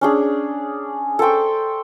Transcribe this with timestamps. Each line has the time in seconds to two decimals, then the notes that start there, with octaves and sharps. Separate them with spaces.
0.01 C#4 D4 G#4
1.19 A4 C5 G5 C#6